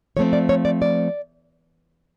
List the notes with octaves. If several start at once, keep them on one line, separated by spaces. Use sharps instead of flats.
F3 A3 C4 C#5
D5
C#5
D5
D5